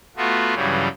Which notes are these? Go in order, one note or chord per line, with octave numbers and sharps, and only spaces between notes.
A3 B3 F4 F#4
G2 C#3 E3 F#3 G3